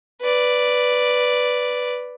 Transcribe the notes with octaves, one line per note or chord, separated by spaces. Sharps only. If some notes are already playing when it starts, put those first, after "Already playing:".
B4 D5